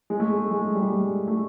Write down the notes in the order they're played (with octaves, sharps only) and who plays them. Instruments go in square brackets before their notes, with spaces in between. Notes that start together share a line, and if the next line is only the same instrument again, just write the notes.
[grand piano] G#3
A3
G#3
G#3
G3
G#3
A3
A3
G#3